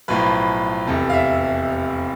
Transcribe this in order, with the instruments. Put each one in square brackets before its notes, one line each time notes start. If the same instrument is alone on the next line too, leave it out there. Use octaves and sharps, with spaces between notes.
[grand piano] B1 A2 F3 B4
F1 E2 C3 A4
F5
E5